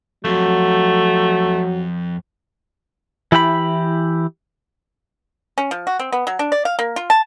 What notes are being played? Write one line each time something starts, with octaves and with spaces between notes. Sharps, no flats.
F2 F#3 A3
E3 E4 G4 F#5 B5
C#4
F3
F#4
C4
B3
F#3
D4
D5
F5
A#3
F4
A5